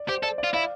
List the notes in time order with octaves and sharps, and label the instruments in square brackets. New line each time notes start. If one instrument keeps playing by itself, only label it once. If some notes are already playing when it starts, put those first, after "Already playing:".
Already playing: [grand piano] D5
[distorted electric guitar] G4 [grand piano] C5
[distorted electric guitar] A4 [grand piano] D5
[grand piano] D5
[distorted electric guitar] F4
[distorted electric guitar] E4 [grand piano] D5 F5